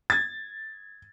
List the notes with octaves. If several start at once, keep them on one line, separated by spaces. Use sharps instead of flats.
G#6 A6